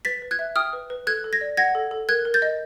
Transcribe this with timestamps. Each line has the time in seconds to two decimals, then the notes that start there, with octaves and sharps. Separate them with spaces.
0.05 B4 A6 B6
0.22 B4
0.31 F#6 G#6
0.39 E5
0.56 G5 D#6 F6
0.73 B4
0.90 B4
1.07 A4 F#6 G#6
1.24 A4
1.33 G#6 A#6
1.41 D5
1.57 F#5 G#6 A#6
1.75 A4
1.91 A4
2.09 A#4 F#6 G#6
2.25 A#4
2.34 G6 A6
2.42 D#5